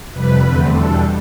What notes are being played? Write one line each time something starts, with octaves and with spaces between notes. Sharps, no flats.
F2 C3 G3 B4
E2 D3 A3 C4
E2 B2 G3 D4 A4